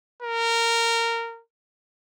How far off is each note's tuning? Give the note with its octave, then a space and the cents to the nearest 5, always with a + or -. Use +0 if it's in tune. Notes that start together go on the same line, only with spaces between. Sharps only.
A#4 -15